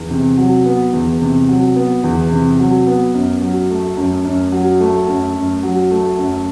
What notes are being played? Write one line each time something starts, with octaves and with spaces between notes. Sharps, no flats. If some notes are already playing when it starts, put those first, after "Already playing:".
Already playing: E2
C3
F#3
B3
E2
C3
F#3
B3
E2
C3
F#3
B3
F#2
F#3
A3
F#2
F#2
F#3
A3
F#2
F#2
F#3
A3
F#2